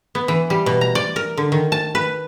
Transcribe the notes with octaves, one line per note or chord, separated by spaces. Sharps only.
B3
E3
G3
B2
A#5
D5
A#4
D3
D#3
A5
B4